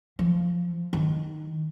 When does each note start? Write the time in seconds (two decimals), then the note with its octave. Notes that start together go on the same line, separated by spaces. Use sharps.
0.19 F3
0.93 D#3